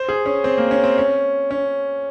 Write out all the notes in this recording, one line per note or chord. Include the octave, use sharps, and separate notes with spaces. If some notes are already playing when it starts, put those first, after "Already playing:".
Already playing: C5
G#4
C#4
C4
A#3
C#4
C4
C#4
C#4